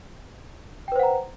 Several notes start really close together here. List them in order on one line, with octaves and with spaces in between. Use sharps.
G5 B4 C5 F#5 A#5